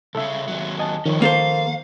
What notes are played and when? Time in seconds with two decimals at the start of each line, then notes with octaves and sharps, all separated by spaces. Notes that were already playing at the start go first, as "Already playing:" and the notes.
0.15 C2 C#3 A4 E5
0.48 D#2 F#3
0.79 D#5 G#5 A5
1.06 F2 D#3 F3 C#4 C#6
1.22 A#3 A4 C5 F5